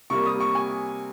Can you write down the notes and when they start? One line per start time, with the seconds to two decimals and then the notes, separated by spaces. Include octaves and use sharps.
0.10 C3 G3 A#3 C#6
0.26 D#6
0.40 C#6
0.55 G#5